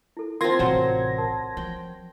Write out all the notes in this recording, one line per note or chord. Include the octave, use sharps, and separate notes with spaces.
E4 A4
C4 D#4 F4 A#4 C6 G#6 A#6
A1 C3 F#3 C5
A#4 F#5 A5
F3 G5